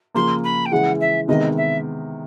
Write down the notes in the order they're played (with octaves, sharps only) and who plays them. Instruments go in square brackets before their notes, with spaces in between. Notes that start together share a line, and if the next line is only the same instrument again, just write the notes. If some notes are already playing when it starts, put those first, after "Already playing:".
[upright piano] C#3 F3 A#3 [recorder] C6
[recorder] B5
G5
[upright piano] C#3 E3 G#3 [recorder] F#5
[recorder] E5
[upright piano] C3 D#3 G#3 B3 [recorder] D#5
[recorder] E5